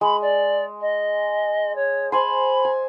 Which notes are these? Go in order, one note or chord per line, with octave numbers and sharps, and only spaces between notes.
G#3 B5
D5
D#5
C#5
C5 G#5 B5 C6
G#5